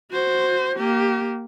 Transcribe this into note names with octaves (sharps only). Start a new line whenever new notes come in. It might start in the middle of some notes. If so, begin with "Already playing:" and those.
F#4 C5
A#3 G4